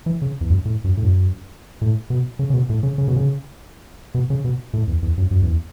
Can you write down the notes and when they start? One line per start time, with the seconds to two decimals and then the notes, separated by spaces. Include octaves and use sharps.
0.06 E3
0.22 C#3
0.41 E2
0.50 F#2
0.65 A2
0.84 F#2
0.97 A2
1.04 F#2
1.81 A2
2.10 B2
2.39 C#3
2.50 C#3
2.54 B2
2.70 A2
2.83 C#3
2.98 C#3
3.08 B2
3.16 C#3
4.15 B2
4.30 C#3
4.45 B2
4.73 A2
4.87 E2
5.02 E2
5.17 F#2
5.31 F#2
5.42 E2